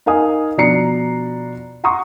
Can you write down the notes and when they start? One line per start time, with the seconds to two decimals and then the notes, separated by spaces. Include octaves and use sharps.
0.06 D#4 A#4 F5 G#5 D#6
0.58 B2 F3 D4 A#5 C7 C#7
1.84 F#5 A#5 C6 C#6 D#6